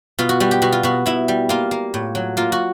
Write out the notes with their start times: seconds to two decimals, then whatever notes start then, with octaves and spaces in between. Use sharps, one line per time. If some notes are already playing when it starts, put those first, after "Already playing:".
0.19 B2 F4
0.29 F#4
0.40 G3 F#4
0.51 G4
0.62 B2 F#4
0.72 F4
0.83 B2 F#4
1.06 B2 E4
1.28 G3
1.49 A#3 F4
1.71 A#3
1.94 A2
2.15 F#3
2.37 A#3 F4
2.52 F#4